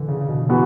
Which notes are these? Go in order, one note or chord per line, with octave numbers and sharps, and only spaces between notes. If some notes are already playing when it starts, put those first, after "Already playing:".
Already playing: D3 E3
C#3
C#3
B2
C#3 E3 B3 F#4